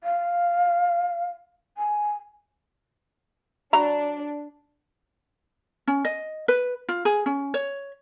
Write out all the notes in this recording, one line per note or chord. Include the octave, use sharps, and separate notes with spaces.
F5
G#5
F#3 D4 A#5 B5
C#4
D#5
B4
F4
G#4
C#4
C#5